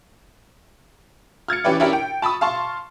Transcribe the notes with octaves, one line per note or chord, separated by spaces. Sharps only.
F6 G#6 A6 C#7
E3 C#4 G4 B4 D5
C#4 D4 E4 G4 A#4
G5
A5 B5 C#6 D#6
F5 A5 C6 C#6